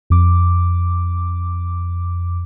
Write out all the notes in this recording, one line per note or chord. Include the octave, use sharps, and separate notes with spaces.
F2 D6